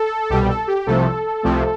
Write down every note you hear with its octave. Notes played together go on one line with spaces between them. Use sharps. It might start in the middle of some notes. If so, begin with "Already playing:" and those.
Already playing: A4
C2 B2 G3 G4
G4
A4
G4
C2 C3 F3 A3 A4
C2 C3 F3 A3